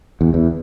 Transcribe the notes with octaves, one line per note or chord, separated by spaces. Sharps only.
E2
E2